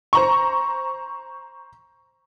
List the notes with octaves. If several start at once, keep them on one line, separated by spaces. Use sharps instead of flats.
C5 A#5 C#6